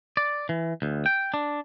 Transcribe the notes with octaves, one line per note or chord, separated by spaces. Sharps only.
D5
E3
D2
G5
D4